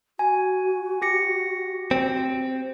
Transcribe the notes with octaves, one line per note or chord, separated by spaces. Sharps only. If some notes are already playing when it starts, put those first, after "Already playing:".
F#4 G#5
G4 A#6 C#7
C4